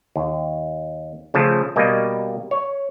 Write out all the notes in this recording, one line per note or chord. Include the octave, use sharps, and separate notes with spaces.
D#2
C#3 F3 A3 A5
B2 G3 A#3 D#5
C#5